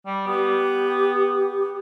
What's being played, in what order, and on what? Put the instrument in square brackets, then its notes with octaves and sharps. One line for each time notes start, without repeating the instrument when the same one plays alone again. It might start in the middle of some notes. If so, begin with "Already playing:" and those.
[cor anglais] G3
[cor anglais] B3 [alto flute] G4